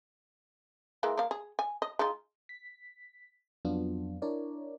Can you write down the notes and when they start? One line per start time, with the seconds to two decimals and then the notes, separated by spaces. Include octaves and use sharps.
1.03 E3 G#3 A#3
1.17 A#3 F5
1.31 G#4
1.59 G#5
1.82 D#5
1.99 G#3 D#4 F4
2.49 B6
3.65 F2 F#3 B3 D4 F4
4.22 D4 E4 A#4 C#5 D5